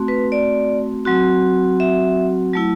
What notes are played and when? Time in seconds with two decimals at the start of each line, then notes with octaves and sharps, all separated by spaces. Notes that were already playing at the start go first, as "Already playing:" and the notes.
Already playing: A3 C4 F#4
0.08 B4
0.32 D5
1.05 F#3 C4 F#4
1.80 E5
2.54 F#3 A3 E4